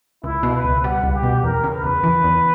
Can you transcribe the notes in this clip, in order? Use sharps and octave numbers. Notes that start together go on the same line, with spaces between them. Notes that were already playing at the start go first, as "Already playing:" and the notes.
C#2 E4
B2
B4
C#2
G3 F#5
C#2
G4
B2
E2 A#4
C#3
B4
E2
E3
E2